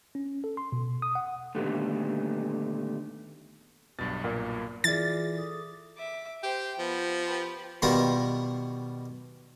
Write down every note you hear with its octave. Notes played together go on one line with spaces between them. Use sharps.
C#4
A4
C6
B2
D#6
F#5
A#2 D3 D#3 G3 A3 B3
B1 G2 B2 A6
A#2
E3 E4 F4 G#4 D5 A6
A4 D6 D#6
E5 D6
G4 C5 G5
F3 B3
G4 B4
B2 D#3 G3 F4 A#4